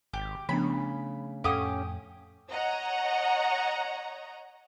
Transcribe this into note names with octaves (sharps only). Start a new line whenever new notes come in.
G#1 G4
C#3 F3 A3 B3 D4 B5
F2 A2 C#4 G4 A4 F5 F#5 D#6
C#5 D#5 F#5 A#5